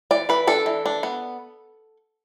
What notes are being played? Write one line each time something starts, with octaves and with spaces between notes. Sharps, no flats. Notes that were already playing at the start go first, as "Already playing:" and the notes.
E3 D5
E3 B4
D4 A4
E3
D4
B3